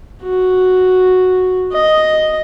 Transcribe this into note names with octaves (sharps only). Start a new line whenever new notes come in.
F#4
D#5